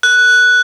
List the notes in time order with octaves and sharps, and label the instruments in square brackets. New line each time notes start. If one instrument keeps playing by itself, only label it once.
[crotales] F#6